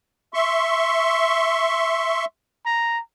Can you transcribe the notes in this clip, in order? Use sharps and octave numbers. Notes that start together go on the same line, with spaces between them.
E5 C6 C#6
A#5